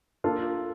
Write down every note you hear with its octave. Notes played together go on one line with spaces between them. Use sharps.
A#3 D4 F4 A4